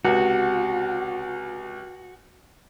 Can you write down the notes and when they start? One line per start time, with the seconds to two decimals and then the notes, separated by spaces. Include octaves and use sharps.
0.05 C#2 C3 F#4